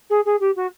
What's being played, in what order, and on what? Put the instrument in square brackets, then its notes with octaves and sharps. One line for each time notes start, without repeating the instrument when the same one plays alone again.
[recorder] G#4
G#4
G4
F#4